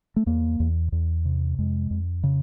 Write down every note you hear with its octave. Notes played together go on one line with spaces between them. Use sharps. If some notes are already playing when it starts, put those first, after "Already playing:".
A3
E2 A#3
E2
E2
C3
F2 G#3
F2
C#3